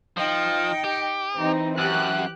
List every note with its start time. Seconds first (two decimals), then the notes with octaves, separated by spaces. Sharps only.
0.17 F3 D#4 G5
0.84 G4
1.37 E3 C4 D#4
1.78 F#2 G4 F#6